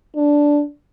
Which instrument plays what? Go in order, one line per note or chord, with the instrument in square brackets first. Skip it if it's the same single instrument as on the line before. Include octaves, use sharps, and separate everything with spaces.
[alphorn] D4